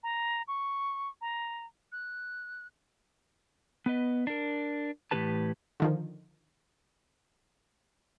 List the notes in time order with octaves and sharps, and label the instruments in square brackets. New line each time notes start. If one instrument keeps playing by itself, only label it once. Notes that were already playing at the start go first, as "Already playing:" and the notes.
[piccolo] A#5
C#6
A#5
F#6
[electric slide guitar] B3 B4 D#5
D4 A#4
A2 E3 A#3 G4 B4 A5
[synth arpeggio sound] D3 D#3 F3